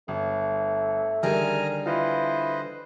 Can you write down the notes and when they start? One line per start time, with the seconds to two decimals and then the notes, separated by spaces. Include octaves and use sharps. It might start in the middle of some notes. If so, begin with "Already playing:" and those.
0.08 G1 A3
1.23 D3 D#3 G3 G#4 G#5 A#5 F6
1.86 E3 F4 B4 C5 D#5